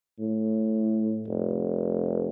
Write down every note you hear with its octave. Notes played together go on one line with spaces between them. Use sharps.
A2
F1